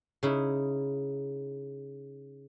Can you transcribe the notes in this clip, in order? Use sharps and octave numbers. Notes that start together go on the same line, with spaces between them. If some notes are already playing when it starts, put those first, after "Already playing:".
C#3 D#4 E4